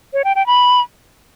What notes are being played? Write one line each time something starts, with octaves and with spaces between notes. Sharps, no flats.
C#5
G5
G5
B5